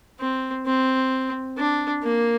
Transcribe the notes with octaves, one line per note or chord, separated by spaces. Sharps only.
C4
C4
D4
A#3